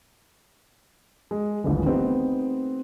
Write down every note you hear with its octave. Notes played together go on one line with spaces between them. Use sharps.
G#3
D#1 A1 D3 E3
A3 B3 C4 D#4 G4 B4